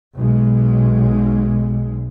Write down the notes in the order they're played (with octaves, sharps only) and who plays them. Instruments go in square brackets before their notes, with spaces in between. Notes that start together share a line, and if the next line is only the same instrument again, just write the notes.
[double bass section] B1 G#3